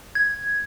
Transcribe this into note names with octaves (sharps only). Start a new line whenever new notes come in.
G#6